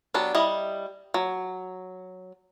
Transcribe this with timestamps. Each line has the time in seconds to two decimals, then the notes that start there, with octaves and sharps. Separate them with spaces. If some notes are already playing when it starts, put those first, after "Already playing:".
0.14 F#3 B3 D4 G4
0.35 G3 E4 D#5
1.14 F#3